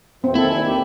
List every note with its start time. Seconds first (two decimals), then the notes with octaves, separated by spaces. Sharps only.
0.24 F2 B2 E3 C4
0.35 D#2 D#3 A#3 E4 A4
0.50 D#3 G3 G#5
0.65 D#2 G4